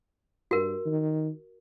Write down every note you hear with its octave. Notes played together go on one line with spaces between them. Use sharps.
G2 F#4 A#4
D#3